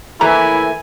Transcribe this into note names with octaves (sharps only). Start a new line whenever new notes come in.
E3 A3 A#3 E4 B4 C#5 G#5 A#5